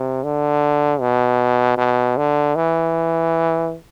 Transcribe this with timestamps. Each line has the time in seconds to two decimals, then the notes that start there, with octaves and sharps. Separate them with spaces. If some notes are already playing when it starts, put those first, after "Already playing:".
Already playing: C3
0.24 D3
1.01 B2
1.77 B2
2.17 D3
2.56 E3